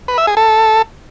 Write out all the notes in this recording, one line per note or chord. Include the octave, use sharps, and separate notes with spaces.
B4
E5
G#4
A4